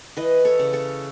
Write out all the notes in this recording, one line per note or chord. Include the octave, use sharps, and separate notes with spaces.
E3 B4 D#5
A4 C#5
C#3
A4 C#5